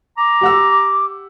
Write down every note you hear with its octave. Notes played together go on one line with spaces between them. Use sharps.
A#5 D6
G4 F#5 E6